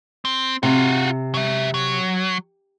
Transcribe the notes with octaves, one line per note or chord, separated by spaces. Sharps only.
C4
C3 F4 F#4
F#3 E5
F#3